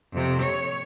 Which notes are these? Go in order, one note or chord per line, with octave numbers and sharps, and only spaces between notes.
F2 C3
C#5